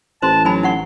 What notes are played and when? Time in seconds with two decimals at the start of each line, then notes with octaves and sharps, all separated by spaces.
0.22 A1 C5 A5 C6
0.45 F#3 D#4 G#5 B5
0.63 D#4 F#5 C#6